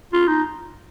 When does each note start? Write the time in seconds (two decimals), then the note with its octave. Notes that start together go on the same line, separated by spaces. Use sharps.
0.13 F4
0.28 D#4